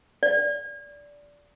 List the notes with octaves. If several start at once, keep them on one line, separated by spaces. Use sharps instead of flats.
D5